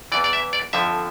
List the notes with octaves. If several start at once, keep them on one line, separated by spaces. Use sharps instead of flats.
E2 E3 D5
D5
E5
D5
F2 D3 F3 E5